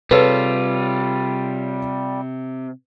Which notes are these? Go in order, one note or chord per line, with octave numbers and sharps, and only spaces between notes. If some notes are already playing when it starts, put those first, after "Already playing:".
C3 G3 F4 G#4 A4 B4 C#5